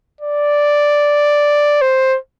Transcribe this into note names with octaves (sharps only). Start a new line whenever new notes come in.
D5
C5